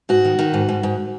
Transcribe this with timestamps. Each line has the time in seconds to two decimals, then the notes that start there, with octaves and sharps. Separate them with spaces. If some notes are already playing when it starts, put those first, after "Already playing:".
0.09 G#2 F#4
0.25 D#3
0.39 D#3
0.54 G#2
0.69 G#2
0.83 G#2